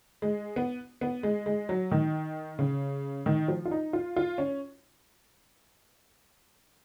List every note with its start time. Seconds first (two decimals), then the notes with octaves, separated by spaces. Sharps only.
0.22 G#3
0.56 B3
1.01 B3
1.23 G#3
1.46 G#3
1.69 F#3
1.91 D#3
2.59 C#3
3.26 D#3
3.48 F3
3.65 F4
3.71 D#4
3.93 F4
4.16 F4
4.38 C#4